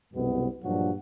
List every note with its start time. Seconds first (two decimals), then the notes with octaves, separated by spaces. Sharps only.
0.13 C2 F#2 B2 G#3 B3
0.63 G2 A#2 F3 F#3 D4 F#4